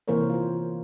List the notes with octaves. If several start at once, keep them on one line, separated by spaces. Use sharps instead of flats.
C3 E3 A#3 A#4 C5 C#5
F4 C5